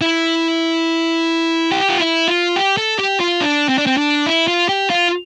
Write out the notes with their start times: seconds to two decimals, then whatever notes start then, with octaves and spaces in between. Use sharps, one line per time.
0.01 E4
1.71 G4
1.89 F4
2.00 E4
2.28 F4
2.56 G4
2.77 A4
2.99 G4
3.20 F4
3.41 D4
3.69 C4
3.78 D4
3.87 C4
3.97 D4
4.26 E4
4.48 F4
4.69 G4
4.90 F4